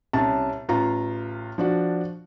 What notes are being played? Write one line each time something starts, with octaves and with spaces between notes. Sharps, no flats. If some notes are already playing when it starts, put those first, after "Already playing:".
C2 C#4 A5
A1 F4 A#5
F3 D4 F#4